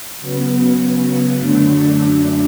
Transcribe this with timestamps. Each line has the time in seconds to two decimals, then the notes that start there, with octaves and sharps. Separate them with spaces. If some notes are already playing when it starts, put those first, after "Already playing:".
0.20 C#3 F#3 B3
1.38 F#2 D3 F#3 A3 D4